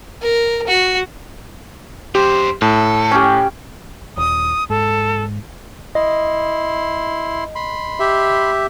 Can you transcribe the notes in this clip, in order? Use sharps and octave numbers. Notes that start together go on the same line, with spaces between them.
A#4
F#4
F#2 G4 C5
A2 A4
C#4 G4
D#1 D#6
G#2 A4
E4 D#5 C6
B5 C6
G4 E5